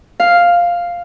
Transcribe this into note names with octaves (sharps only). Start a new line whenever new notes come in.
F5